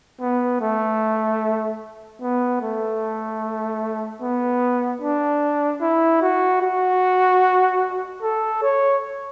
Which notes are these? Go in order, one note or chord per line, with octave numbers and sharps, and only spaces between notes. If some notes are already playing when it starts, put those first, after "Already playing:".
B3
A3
B3
A3
B3
D4
E4
F#4
F#4
A4
C#5